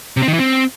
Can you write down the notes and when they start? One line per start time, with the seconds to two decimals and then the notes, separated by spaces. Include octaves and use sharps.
0.17 C3
0.22 C4
0.28 D#3
0.33 E3
0.39 C4